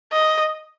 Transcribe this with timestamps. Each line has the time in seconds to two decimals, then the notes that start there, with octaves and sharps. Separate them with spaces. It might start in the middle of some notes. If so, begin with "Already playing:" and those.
0.12 D#5